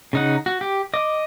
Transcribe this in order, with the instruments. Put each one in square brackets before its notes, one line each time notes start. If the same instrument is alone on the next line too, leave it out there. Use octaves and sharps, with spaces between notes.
[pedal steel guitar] C#3 D#4 F#5
F#4
G4
D#5 D6